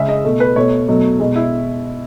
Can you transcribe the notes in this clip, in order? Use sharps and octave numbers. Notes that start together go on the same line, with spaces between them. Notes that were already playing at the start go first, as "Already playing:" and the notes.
Already playing: C#3 G#3 E5
D#5
B2 A3
B4
B2 A3 C#5
B2 F#3 A3
B2 G#3
E4